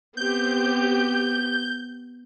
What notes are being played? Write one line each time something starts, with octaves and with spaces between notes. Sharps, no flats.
B3 C4 G4 G6